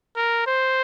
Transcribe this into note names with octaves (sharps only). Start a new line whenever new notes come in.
A#4
C5